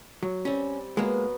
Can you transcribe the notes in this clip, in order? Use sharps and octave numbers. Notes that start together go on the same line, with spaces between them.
F#3
G3 C4 C#4
F#3 G#3 A#3 B3